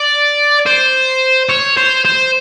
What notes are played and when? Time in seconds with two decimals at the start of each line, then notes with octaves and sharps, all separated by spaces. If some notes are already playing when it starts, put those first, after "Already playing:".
Already playing: D5
0.66 C5
1.49 C#5
1.77 C5
2.05 C5